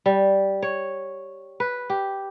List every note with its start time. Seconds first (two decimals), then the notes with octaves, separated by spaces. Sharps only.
0.06 G3
0.62 C#5
1.60 B4
1.90 G4